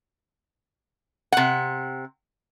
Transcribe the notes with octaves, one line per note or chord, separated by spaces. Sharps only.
C3 F#5